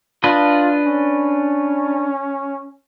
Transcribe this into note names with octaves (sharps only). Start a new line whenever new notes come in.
D4 F4 B4 D#5
C#4